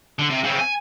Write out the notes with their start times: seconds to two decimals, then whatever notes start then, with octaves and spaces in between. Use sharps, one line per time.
0.19 D3
0.30 C3
0.44 C#3 C4
0.60 G#5